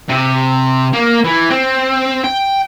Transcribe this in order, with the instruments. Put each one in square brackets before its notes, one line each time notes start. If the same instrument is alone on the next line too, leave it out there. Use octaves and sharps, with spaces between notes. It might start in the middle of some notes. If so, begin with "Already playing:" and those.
[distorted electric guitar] C3
A#3
E3
C4
G5